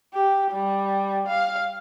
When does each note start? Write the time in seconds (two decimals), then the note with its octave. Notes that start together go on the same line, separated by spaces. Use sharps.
0.14 G4
0.52 G3
1.27 F5